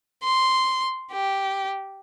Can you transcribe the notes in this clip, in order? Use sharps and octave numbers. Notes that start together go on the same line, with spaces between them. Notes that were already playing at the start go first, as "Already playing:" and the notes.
C6
G4